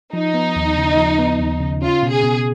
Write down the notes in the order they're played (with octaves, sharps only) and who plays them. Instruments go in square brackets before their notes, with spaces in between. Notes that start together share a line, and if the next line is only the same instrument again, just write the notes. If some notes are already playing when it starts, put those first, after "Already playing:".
[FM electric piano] F3 [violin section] D#4
[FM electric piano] B3
D#2
C#3
F3
B3
D#2
C#3
[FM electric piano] C#4 [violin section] F4
[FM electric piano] B2
[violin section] G#4
[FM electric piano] B2